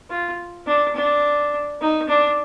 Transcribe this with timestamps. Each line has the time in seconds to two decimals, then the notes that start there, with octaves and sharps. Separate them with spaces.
0.10 F4
0.67 D4
0.96 D4
1.81 D#4
2.09 D4